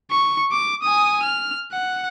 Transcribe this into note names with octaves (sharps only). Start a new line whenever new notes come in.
C#6
D6
G#5 D#6
F6
F#5